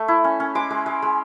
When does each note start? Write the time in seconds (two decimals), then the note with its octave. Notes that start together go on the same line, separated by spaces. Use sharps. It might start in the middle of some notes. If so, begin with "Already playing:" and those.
Already playing: A3
0.08 E4
0.24 C#4
0.40 C#4
0.55 G#3 D6
0.70 G#3
0.86 G#3
1.02 G#3